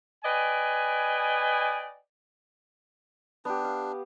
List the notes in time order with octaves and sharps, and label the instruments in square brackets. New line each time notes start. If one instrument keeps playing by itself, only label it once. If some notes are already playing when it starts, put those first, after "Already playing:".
[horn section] B4 D5 D#5 G5 G#5
[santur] B3 G4 [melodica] D4
[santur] F5